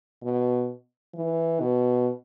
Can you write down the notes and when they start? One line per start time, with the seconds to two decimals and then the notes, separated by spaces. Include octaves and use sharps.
0.23 B2
1.14 E3
1.60 B2